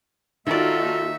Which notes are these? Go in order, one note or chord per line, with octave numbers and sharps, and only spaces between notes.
D#3 A#3 D#4 F4 F#4 A4 D5 E5